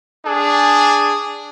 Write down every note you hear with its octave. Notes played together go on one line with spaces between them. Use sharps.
D4 G#4